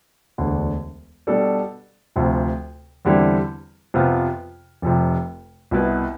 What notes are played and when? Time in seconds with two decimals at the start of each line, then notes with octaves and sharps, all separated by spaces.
0.38 E1 D2 D3
1.27 B2 G3 D4 A4 D5
2.16 D2 C3 F3 C4
3.05 E2 D3 G3 C4 E4
3.94 F2 C3 F3 B3 F4
4.82 F1 F2 C3
5.71 C2 B2 B3 E4 B4